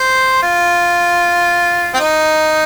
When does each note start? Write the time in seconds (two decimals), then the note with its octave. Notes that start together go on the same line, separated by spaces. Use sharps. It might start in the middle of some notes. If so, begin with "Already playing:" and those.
Already playing: C5
0.43 F4
1.94 C4
2.00 D#4